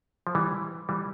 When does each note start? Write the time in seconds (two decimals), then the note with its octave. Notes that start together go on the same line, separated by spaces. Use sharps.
0.27 F3
0.35 E3 G3
0.89 E3 G3